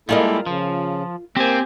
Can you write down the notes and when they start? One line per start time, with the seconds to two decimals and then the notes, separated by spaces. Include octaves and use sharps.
0.09 G3 G#3 A#3 E4 F4 A4 A#4 D#5
0.46 C#3 F3
1.37 A#3 C4 G4 G#5